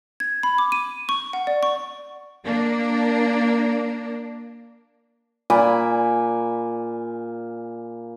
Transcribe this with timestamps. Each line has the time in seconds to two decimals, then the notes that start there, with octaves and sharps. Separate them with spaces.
0.20 G#6
0.43 B5
0.58 D6
0.72 D#7
1.09 C#6
1.33 F#5
1.47 D5
1.63 C#6
2.44 A#3 D4
5.50 A#2 G#5 B5 D6